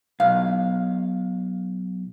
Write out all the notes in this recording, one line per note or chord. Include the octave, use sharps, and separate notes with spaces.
B1 F5